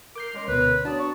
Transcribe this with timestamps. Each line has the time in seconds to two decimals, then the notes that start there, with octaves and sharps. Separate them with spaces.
0.15 A#4 D6 G6 C7
0.34 G#3 C#4 C6
0.48 D2 B2 B4
0.85 F#3 B3 D4 D5 A5
0.98 A#5 C#6